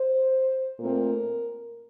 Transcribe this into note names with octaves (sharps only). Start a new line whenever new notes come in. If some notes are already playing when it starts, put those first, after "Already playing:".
Already playing: C5
A#2 A3 C4 A#4